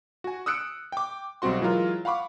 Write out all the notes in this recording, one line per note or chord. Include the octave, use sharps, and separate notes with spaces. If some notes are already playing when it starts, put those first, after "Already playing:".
F#4 G#5
D#6 E6 F#6 C#7 D7
G5 D6
B1 G3 C4 F#4 C6
E3 F#3 G#3 F4 A#4
F5 F#5 B5 C#6 D6